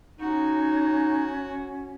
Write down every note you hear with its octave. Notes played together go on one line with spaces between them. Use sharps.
C#4 D#4 F#4